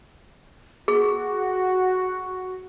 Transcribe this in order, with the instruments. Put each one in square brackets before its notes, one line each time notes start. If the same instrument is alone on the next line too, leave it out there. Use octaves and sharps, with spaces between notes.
[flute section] F#4 [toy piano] G#4